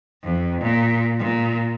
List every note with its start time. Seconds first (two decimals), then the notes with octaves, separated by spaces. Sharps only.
0.23 F2
0.62 A#2
1.19 A#2